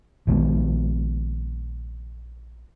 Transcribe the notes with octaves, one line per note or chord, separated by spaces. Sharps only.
A#1 D#3 G#3 B3